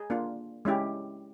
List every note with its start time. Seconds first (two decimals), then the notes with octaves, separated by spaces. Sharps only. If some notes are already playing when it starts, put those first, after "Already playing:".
Already playing: G#4
0.10 A#3 D4 F4
0.65 G#3 C#4 E4 G4